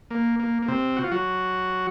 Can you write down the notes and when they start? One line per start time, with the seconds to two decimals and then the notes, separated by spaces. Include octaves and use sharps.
0.11 A#3
0.40 A#3
0.62 A#3
0.68 C3 C4
0.97 F#4
1.04 F4
1.12 F#3 F#4